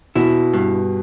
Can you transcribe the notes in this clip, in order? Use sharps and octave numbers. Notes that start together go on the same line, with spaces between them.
B2 E4
G2